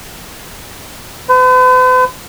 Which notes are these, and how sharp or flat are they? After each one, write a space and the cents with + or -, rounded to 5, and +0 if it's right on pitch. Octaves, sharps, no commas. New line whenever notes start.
B4 +45